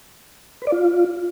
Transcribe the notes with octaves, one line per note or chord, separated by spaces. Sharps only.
B4
D5
F4